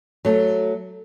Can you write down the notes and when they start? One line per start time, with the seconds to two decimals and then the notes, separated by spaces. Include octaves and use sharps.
0.25 F#3 A3